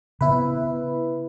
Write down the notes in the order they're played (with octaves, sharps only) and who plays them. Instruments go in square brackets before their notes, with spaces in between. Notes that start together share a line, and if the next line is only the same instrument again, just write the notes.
[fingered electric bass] C#3 B3 [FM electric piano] E4 B4